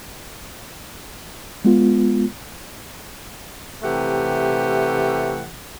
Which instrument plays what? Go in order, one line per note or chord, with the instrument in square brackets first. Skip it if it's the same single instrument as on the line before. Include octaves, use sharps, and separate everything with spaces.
[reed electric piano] G#3 B3 F4
[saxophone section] C3 E3 A3 G4 F#5